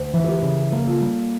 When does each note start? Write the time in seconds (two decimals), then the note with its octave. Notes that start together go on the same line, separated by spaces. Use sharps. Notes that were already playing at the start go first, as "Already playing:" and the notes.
Already playing: D2
0.13 E3
0.24 A4
0.28 G4 A#4
0.43 C#3
0.72 A#3 A4
0.79 A#4
0.87 F4 A4
1.01 G3